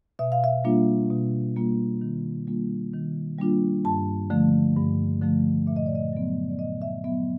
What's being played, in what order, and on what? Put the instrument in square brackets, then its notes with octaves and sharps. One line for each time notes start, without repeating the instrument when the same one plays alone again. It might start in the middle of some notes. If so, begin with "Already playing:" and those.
[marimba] B2 E5
F5
E5
G3 A#3 D4 F4
B2
G3 A#3 D4 F4
D#3
G3 A#3 D4 F4
D#3
G3 A#3 D4 F4
G2 A5
D3 F3 A3
G2
D3 F3 A3
A#2 E5
D#5
D5
D#5
F#3 B3
D5
A#2 D#5
E5
F#3 B3 E5